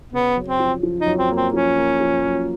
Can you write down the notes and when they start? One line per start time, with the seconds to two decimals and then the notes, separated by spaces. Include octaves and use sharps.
0.13 C#3 B3
0.36 F#2
0.48 C4
0.60 F3
0.83 F3
1.00 D#4
1.06 F#2
1.18 C4
1.30 A#3
1.36 C4
1.53 F3 C#4
1.77 A#3
2.01 F3
2.24 F#2